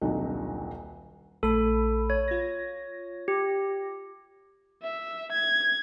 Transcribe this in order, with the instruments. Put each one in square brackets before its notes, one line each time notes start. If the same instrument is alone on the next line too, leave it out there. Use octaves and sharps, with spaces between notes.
[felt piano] D#1 B1 G2 C3 D#4 F#4
[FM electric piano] A#1 A3 B5 [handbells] A4
[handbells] C#5
[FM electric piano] F4 A#6
[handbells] G4
[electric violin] E5
G#6